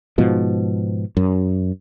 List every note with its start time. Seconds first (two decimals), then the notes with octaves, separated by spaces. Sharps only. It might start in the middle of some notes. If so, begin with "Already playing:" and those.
0.18 G#2 B2 F3
1.17 F#2